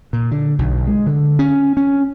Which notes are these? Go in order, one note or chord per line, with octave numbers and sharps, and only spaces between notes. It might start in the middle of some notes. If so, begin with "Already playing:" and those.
A#2
D3
B1
G#3
D3
C#4
C#4